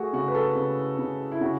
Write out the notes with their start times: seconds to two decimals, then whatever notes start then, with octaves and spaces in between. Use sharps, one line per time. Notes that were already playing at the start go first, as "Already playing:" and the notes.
Already playing: A3 F#4 G#4
0.13 C#3 F#4
0.28 B4
0.35 A4
0.56 C#3
0.99 C#3
1.32 E4
1.41 C#3 F#4